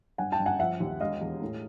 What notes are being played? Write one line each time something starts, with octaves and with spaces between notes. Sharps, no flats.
G1 F#5 G#5
G5 A5
G1
F#5 G#5
F3 E5 F#5
D#2
E1 D#5 F5
E2
A2